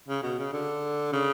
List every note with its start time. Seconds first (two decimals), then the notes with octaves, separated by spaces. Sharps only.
0.09 C#3
0.23 B2
0.39 C#3
0.53 D3
1.12 C#3